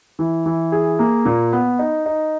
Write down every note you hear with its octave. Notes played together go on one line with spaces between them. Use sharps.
E3
E3
G#4
A#3
A#2
B3
D#4
D#4